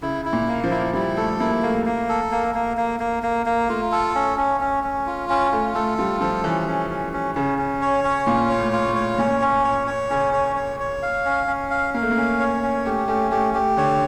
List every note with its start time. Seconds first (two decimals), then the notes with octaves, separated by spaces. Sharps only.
0.02 C#3 E4
0.25 E4
0.33 A#2
0.48 A#3
0.64 F3
0.71 E4
0.93 G3 E4
1.17 A3 A4
1.40 A#3 E4
1.62 A3 A#3
1.85 A#3
2.09 A4
2.31 A#3
2.55 A#3
2.77 A#3
3.00 A#3
3.23 A#3
3.46 A#3
3.69 A3 F4
3.92 A4
4.15 C#4
4.38 C#4
4.61 C#4
4.84 C#4
5.06 F4
5.29 C#4
5.52 A3 F4
5.75 A3 A4
5.98 G3 F4
6.20 F3 A4
6.44 E3 C#4
6.67 C#4
6.90 C#4
7.13 C#4
7.35 C#3 C#4
7.58 C#4
7.82 C#5
8.04 C#4
8.27 A#2 F4
8.50 C#5
8.58 A2
8.72 F4
8.88 A2
8.95 C#5
9.15 A2
9.18 A#2 C#4
9.41 C#4
9.64 C#5
9.87 C#5
10.10 C#3 C#4
10.33 C#5
10.56 C#5
10.80 C#5
11.02 F5
11.25 C#4
11.47 C#4
11.71 F5
11.94 A#3 F5
12.02 A3
12.11 A#3
12.17 C#4
12.39 C#5
12.63 C#4
12.86 A3 G4
13.08 A3 C#4
13.31 A3 G4
13.54 A3 G4
13.77 D3 C#5